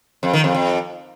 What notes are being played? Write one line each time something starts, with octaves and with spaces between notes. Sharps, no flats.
F2
D#3
F2
F2